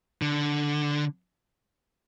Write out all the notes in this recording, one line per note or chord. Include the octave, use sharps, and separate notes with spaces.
D3